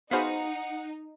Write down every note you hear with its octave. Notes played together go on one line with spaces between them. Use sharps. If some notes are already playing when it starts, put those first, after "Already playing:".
B3 D#4 F#4 G#4 C5 F5 F#5 B5